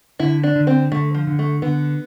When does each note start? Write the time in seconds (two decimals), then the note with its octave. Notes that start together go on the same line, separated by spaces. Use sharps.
0.20 D3 E4
0.44 D4
0.56 D3
0.67 C4
0.92 D3 A3
1.15 F3
1.27 D3
1.39 A3
1.62 D3 B3